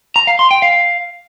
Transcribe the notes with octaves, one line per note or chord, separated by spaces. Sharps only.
A#5
F5
C6
G5
F5